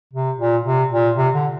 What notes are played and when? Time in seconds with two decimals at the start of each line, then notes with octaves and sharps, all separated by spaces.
0.13 C3
0.39 A#2
0.66 C3
0.91 A#2
1.17 C3
1.34 D3